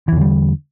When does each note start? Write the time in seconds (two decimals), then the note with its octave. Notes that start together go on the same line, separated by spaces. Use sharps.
0.08 E3
0.12 E2
0.17 D3
0.21 G3